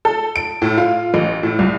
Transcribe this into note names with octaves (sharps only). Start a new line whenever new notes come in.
A4
D7
A2
F4
A1
A2
C2